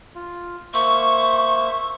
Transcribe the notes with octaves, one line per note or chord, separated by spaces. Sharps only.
F4
A#3 C5 E5 C#6